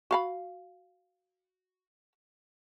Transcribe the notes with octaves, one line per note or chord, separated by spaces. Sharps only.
F#4 F5 B5